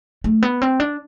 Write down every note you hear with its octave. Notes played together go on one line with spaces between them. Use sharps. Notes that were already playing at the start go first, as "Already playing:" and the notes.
A3
B3
C4
D4